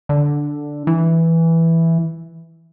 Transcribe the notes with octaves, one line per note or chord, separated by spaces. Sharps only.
D3
E3